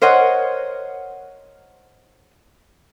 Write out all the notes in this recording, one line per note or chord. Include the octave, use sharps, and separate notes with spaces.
A#4 C5 C#5 D#5 F#5